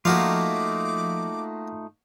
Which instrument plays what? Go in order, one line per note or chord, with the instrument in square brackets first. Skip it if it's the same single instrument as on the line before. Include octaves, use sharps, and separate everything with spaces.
[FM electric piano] F3 [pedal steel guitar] A3 D#4 F4 [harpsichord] A#3 F#4 F5 [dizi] D6